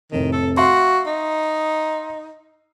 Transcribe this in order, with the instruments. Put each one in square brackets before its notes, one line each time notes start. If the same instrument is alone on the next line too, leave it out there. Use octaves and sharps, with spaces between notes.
[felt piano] F1 A2 C3 [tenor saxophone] D#3
[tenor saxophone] A4
[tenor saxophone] F#4 [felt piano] E5 F5 C6
[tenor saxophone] D#4